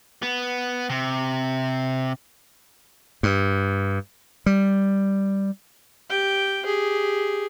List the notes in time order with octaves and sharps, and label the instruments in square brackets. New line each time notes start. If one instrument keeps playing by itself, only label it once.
[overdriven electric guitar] B3
C3
[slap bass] G2
G3
[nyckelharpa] G4 G5
G4 G#4